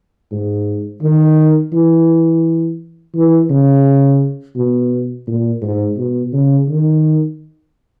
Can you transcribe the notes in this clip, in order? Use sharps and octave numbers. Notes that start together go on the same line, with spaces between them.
G#2
D#3
E3
E3
C#3
B2
A#2
G#2
B2
C#3
D#3